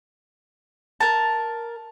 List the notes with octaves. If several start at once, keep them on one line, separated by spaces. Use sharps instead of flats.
A#4 A5